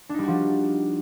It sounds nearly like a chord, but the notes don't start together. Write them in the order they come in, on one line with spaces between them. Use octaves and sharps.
D4 D#4 G3 F#4 F3